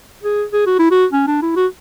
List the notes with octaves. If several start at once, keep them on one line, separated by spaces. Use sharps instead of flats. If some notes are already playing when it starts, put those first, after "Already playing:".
G#4
G#4
F#4
E4
F#4
C#4
D4
E4
F#4